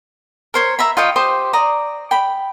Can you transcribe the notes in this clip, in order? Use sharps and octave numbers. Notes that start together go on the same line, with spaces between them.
A#4 C5 C#5
E5 A#5 B5
F4 D#5 G5 C#6
G4 C5 D#6
D5 A#5 D#6
G5 B5